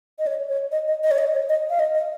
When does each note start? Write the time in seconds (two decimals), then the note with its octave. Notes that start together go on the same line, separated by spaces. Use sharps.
0.19 D#5
0.27 C#5
0.49 C#5
0.72 D#5
0.88 D#5
1.03 D#5
1.11 C#5
1.18 D#5
1.34 C#5
1.49 D#5
1.70 F5
1.79 D#5
1.94 D#5